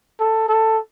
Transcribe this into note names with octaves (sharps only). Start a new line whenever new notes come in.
A4
A4